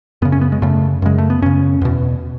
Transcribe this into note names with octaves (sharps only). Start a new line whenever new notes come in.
F#2 C#3 B3
C#4
B3
G#3
F#2 C#3 A3
F#2 C#3 G#3
A3
B3
F#2 C#3 C#4
E2 B2